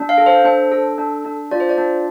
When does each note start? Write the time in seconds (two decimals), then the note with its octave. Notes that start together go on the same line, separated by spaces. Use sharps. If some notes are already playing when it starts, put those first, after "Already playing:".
Already playing: D4
0.09 F5
0.18 A4
0.26 C5
0.44 D4 C5
0.72 A4
0.98 D4
1.25 D4
1.51 F4 D5
1.60 C5
1.69 D5
1.78 D4